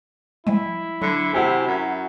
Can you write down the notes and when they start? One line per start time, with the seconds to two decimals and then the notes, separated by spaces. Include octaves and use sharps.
0.47 F3 G3 G#3 E4
1.02 D3 F#3
1.33 C3 F#4 G#5
1.67 F#2